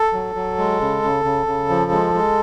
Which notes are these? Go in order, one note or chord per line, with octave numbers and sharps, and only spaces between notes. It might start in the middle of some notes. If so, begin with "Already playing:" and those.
Already playing: A4
F#3
F#3
G#3
C#3
C#3
C#3
C#3
F3
G#3
G#3